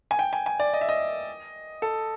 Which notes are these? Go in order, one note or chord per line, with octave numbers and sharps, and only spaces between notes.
G#5
G5
G#5
G#5
D5
D#5
E5
D#5
A4